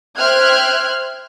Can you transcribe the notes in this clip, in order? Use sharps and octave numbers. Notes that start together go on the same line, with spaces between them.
C5 E5 G5 F6 F#6 G#6